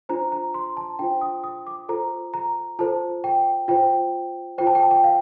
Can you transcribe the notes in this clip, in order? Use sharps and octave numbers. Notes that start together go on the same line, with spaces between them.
D4 F4 C5 A#5
A#5
C6
A5
D4 F4 C5 G5
D#6
D#6
D6
F4 A4 C5 A#5
A#5
F4 A4 C5 A5
G5
F4 C5 G5
F4 C5 G5
A5
G5
A5
G5
F5